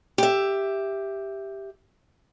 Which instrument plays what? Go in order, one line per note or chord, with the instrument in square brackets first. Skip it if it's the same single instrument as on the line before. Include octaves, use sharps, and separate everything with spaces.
[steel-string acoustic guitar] G4 E5